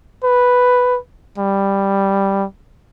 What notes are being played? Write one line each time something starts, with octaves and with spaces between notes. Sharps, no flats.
B4
G3